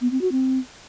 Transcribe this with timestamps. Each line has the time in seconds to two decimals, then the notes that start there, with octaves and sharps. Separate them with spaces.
0.01 B3
0.11 C4
0.21 F#4
0.32 C4